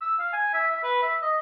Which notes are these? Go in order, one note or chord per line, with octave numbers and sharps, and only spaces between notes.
E6
F5
G#5
E5
E5
B4
E5
D#5